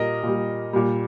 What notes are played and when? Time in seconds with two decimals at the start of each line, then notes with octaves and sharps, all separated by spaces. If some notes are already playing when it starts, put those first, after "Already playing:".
Already playing: A#2 G3 A#4 D#5
0.23 A#2 G3
0.73 A#2 G3